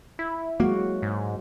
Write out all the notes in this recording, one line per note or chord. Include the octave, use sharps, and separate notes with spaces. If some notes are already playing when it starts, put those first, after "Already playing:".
E4
F#3 G#3 A#3 F#4
G#2